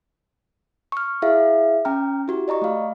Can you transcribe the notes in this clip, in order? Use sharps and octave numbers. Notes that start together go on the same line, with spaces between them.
C#6 F6
E4 G#4 E5 F5
C#4 G5 A#5 F6
E4 F#4 G4
D5 D#5 A#5 C#6
A3 F5